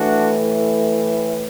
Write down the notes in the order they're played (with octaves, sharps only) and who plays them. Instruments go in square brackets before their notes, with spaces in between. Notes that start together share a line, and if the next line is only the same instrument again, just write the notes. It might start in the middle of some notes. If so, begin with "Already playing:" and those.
Already playing: [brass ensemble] A2 E3 A3 D4 F#4